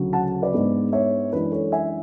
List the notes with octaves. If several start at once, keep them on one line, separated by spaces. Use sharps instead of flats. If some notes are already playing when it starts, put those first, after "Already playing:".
Already playing: D2 C#3 F#3 C#4
F#5 A5
B4 D5
G#2 G#3 B3 D4
C#5 E5
F#2 E3 G#3 D4 B4
A4 C#5
E5 G#5